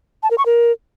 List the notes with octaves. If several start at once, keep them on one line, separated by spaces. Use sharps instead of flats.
A5
A#4
C#6
A#4